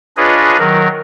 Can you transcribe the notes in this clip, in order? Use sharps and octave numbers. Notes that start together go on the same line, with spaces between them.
D4 F4 G#4 B4 C#5 D#5
D#3 F#3 A#4